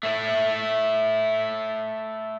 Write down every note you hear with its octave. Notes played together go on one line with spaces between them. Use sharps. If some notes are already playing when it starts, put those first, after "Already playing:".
A3 E4